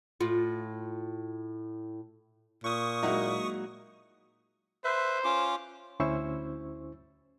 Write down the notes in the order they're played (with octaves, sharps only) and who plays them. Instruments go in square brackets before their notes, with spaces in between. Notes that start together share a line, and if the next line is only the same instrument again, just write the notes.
[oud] A2 F4
[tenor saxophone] A#2 [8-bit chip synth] C#6 D#6
[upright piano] F#3 G#3 A#3 [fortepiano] D#4 E4 F#4
[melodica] B4 E5 [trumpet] C5
[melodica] C#4 F4 D6
[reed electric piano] D2 C#4 E4 C5 C#6 E6